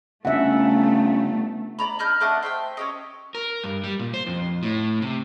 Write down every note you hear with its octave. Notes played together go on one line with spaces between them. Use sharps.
G1 C#3 A3 E5 F#5
D5 A#5 B5
D4 D#5 F6 G6
A3 D4 D#5 F#5
C5 E5 F#5 G5
C#4 G4 D#5
A#4
G2
G3
A#2
C5
F2
A2
C3